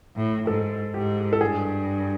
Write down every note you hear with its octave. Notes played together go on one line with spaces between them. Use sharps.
A2
G#2 A4
G#2 G4
A4
G2 G#4